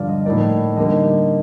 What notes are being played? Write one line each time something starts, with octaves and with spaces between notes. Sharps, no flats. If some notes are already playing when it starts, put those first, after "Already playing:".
Already playing: G2 D3 F3 D5 F5
D#5
A2 F3 A#3 D#4 D5
D3 G3 A#3 D#4 D#5